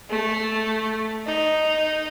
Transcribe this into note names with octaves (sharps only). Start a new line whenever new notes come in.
A3
D#4